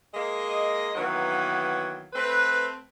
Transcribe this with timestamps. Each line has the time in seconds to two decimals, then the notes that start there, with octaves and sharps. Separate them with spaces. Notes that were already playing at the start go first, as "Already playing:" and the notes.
0.13 G#3 A#3 D#5
0.96 D#3 E3 F#3 A#3 B3
2.13 A3 C4 B4